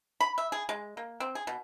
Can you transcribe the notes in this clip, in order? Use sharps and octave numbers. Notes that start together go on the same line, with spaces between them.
B5
E5
G#4
G#3
A#3
C4
G#4
B2